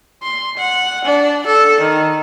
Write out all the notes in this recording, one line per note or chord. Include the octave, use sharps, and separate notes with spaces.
C6
F#5
D4
A4
D#3